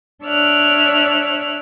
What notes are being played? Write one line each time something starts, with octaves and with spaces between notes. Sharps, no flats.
D4 C#5 D5 E5 F6 F#6